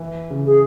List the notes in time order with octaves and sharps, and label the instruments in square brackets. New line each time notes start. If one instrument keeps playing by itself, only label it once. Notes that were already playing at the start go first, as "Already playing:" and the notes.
Already playing: [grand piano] E3
C#3
[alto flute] G#4